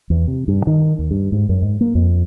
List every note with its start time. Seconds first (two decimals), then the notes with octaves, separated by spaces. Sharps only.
0.10 E2
0.27 C3
0.48 G2
0.67 D#3
0.99 D#2
1.11 G2
1.32 G#2
1.49 F#2
1.62 G#2
1.81 A#3
1.95 F2